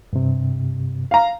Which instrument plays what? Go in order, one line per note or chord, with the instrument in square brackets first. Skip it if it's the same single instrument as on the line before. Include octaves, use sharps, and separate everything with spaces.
[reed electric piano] G2 C3
[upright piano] F5 A#5